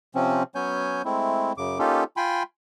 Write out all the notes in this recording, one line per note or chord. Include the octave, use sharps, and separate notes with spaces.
C3 F3 C4 C#4
F#3 B3 C#4 C#5 G#5 G6
G#3 A3 C4 E4
F#2 C#3 D6
A#3 C#4 D#4 F4 G4 A4
F4 G5 G#5 B5 C6